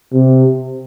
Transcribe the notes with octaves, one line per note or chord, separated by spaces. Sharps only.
C3